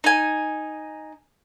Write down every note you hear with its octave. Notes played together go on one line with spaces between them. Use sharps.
D#4 G#5